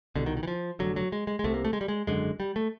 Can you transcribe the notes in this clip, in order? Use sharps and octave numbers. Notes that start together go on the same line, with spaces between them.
C2 B2 D3
D#3
D#3
E3
F3
F1 D#2 D3 F#3
F#3
G#3
G#3
G#3
C2 C3 A3
A#3
A3
G#3
G3
G#3
G#1 F#2 D3 G#3
G3
A3